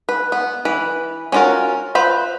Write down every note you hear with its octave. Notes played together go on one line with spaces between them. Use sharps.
B4
B3
E3 B4
C#4 D4 F4 F#4 A#4
F4 B4 C5 B5